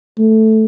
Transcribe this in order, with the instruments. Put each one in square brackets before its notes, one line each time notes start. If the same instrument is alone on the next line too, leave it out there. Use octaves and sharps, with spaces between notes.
[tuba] A3